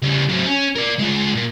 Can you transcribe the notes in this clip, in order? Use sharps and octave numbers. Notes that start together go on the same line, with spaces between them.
C#3 G3
F#3 C4
C#4
A#4 D5
G#3 F4
A#2